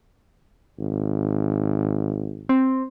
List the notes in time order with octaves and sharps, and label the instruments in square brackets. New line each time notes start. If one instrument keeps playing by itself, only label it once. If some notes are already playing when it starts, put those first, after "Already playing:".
[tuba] G#1
[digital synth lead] C4